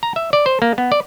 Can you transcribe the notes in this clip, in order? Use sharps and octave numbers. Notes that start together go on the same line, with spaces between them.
A#5
E5
D5
C5
A#3
B3
D5